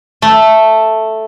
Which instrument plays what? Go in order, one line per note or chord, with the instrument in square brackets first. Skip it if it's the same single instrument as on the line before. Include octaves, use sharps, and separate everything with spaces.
[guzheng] A3